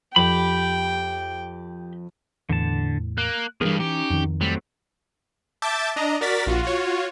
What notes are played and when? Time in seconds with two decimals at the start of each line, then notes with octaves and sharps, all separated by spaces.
0.16 F2 G4 G5 B5
2.49 E2 A2 D3 E3 A5
3.18 A#3 F#6
3.61 E2 G2 E3 G#4 A#4
3.80 C#4 D#4 G4
4.10 F2 D#3
4.41 F#3 G3 A3 C4
5.62 E5 A5 D6 G6 A6
5.96 D4 D#5 A#5
6.21 F#4 A#4 D5 A6 B6
6.46 A#1 F4 F#4
6.63 F4 F#4 C#5